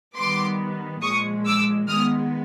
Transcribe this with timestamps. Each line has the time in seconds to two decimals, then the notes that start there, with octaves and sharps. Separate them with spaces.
0.17 D#3 G3 B3 C6 D6
1.02 A#2 F3 G#3 C#6 D#6
1.46 D6 E6
1.88 D#3 G#3 B3 D#6 F6